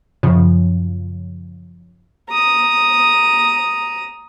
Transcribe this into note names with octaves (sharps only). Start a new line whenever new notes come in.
F#2 C#3 F3
A#5 D#6